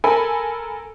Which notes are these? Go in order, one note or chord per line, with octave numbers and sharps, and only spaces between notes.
A4 A#4 G#5 B5